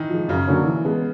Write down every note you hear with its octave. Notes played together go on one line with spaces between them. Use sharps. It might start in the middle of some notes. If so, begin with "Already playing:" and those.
Already playing: D#3 E3
F3 G#3
F#2 C#3
D3 F#3 A#3 C#4
E3
G#3 B3